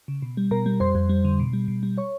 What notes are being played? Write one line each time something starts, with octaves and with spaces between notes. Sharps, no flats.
C#3
B2
G3
B2 A#4 A#5
G3
F2 C5 C6
F2
G3
D3
B2
G3
B2
G3
C#5 C#6